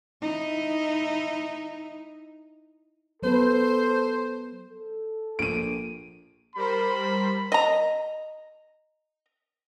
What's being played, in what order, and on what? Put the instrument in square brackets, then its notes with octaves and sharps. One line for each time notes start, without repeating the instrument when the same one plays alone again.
[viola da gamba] D#4 E4
[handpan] F#3 B3 B4 [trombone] A4 [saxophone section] C5
[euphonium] A4
[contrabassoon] A#1 [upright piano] D7 D#7
[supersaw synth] G3 A#4 C5 [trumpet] B5
[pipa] D#5 A#5